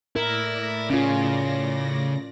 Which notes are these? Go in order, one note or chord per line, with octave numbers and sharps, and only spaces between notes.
A2 E4 A#4 D5 A#6
C#3 C#4 F4